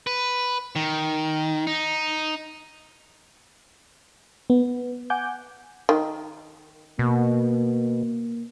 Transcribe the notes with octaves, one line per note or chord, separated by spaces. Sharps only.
B4
D#3
D#4
B3
F#5 G#5 D6 G6
D#3
B2 A#3